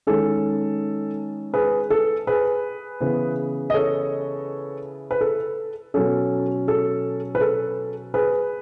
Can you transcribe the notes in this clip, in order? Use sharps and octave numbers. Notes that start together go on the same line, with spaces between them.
D#3 G#3 C#4 A4
G#4 B4
A4
G#4 B4
C#3 E3 B3
D#5
A4 C#5
B4
A4
B2 F#3 C#4 A4
A4
B4
A4
G#4 B4